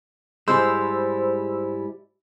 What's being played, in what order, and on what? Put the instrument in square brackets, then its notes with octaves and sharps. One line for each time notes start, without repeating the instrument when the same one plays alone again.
[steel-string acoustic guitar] G#2 G3 E4 [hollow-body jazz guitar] G#3 [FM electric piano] C5 E6